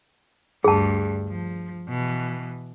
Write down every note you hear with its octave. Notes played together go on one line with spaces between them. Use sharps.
D2 G2 G#4 A5
F3
B2 E3